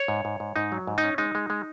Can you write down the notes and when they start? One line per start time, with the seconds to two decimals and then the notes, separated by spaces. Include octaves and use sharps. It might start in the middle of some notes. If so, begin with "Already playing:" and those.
Already playing: C#5
0.08 G#2
0.25 G#2
0.40 G#2
0.56 G#2 D#4
0.72 F#3
0.87 G#2
0.98 D#4
1.04 C#4
1.18 G#3 D#4
1.35 G#3
1.50 G#3